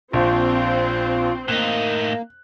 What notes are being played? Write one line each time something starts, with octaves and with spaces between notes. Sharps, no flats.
A#1 C4 F4
A2 A#3 D#4 F#6